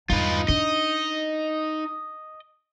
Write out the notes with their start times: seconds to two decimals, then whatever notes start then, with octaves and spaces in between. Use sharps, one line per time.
0.10 E2 G2 D#4 F4 B4
0.48 D4 D#5